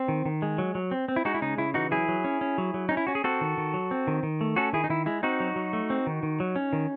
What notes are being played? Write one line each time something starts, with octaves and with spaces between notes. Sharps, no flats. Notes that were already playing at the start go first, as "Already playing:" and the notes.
Already playing: C4
D#3
D#3
G#3
F#3
F#3
C4
C4
E4
G#3 D#4 F#4
E4
C#3 D#4
C#3 E4
E3 D#4 F#4
F#3 E4 G#4
F#3
C#4
C#4
F#3
F#3
C#4 D#4
E4
C#4 F#4
G#4
C4 F#4 A4
D#3
D#3
F#3
C4
D#3
D#3
A3
C#4 F#4 A4
D#3 E4 G#4
D#4
D#3 E4
G#3 E4
C4 D#4 F#4
F#3
F#3
A3
C4
D#3
D#3
F#3
C#4
D#3